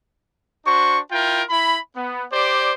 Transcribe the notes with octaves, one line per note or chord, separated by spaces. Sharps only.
D4 F#4 C5 C#6
E4 F4 A#4 G5
E4 B5
B3
G4 C5 D5